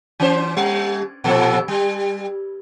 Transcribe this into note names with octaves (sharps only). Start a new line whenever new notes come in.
E3 C#4 C5
G3
A#2 F3 A4
G3